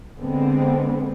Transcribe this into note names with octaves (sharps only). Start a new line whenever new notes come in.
D3 G#3 B3 C4